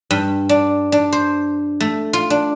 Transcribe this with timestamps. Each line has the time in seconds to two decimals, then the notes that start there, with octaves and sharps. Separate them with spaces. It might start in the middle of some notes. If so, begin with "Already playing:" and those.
0.11 G2
0.49 D4
0.92 D4
1.12 C5
1.80 A3
2.13 F4
2.30 D4